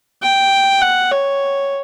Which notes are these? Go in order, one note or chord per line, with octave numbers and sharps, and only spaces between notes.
G5
F#5
C#5